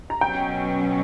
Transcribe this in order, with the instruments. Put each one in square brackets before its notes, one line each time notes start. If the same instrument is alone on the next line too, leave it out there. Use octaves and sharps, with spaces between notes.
[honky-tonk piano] A#5
[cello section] B2 F#3 C#4 [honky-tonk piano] G5